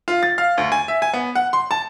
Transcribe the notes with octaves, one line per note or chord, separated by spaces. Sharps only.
F4
A6
F5
D2
G#5
E5
G#5
B3
F#5
C6
A5